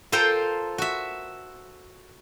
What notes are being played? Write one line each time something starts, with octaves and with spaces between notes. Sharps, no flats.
F4 A4 A#4 C5 G5
F#4 E5